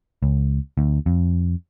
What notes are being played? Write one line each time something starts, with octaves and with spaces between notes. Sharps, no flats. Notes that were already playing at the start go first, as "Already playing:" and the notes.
C#2
D2
F2